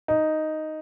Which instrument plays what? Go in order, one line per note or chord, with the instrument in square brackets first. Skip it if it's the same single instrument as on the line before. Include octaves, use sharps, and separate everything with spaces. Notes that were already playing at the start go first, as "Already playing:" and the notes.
[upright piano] D#4